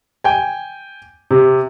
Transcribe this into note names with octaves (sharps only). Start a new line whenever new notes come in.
G5 G#5
C3